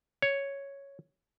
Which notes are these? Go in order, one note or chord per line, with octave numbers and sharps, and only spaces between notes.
C#5